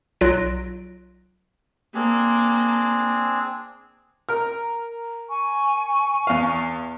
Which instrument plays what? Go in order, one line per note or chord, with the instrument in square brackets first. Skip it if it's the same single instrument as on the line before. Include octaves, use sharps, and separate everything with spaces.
[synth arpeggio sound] B1 F#3 F4 F#6 A#6 D7
[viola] A#3 [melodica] C4 D4 G#4
[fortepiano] A#4 F6
[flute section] G#5 C#6
[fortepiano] E2 F5